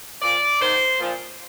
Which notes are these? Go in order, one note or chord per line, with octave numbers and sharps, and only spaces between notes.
A#2 F3 D5
G#2 D#3 C5
A#2 F3